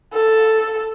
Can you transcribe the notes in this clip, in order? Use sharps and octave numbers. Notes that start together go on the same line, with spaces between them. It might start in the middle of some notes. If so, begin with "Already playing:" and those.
A4